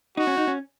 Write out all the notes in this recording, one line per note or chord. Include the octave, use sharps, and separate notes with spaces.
D#4 F#4
C#4
D#4
C#4